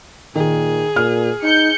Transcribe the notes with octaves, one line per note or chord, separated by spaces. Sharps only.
A#2 D#3 G#4
A#2 F6
D#4 G6 C#7